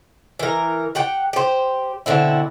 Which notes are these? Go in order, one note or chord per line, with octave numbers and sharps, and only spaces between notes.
E3 A#4
G4 F#5 G5
G4 C5
B2 D3 C4 E4